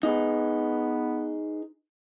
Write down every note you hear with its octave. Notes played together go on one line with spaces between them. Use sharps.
B3 D#4 G#4 B4